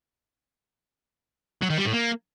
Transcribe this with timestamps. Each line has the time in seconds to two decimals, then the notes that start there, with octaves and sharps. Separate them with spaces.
1.62 F#3
1.70 D#3
1.77 G3
1.85 A2
1.93 A#3